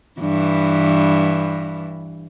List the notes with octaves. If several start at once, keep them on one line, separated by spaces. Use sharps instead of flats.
G2 E3